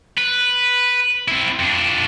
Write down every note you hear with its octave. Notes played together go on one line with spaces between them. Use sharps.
B4
C4 E4
F2 D4